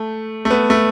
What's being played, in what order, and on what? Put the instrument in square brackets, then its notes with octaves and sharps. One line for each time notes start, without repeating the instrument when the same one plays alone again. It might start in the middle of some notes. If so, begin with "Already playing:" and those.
Already playing: [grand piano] A3
A3
B3
A3